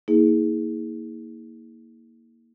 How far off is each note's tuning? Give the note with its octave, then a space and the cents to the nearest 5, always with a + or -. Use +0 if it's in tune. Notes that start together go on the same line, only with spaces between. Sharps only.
A#3 +0 E4 -45 G#4 +0